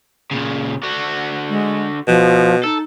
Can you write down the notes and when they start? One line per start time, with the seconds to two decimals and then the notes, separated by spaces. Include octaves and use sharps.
0.31 A#2 C#3
0.83 D3 F#4
1.50 G#3
2.08 B2 F3
2.64 D#4 A4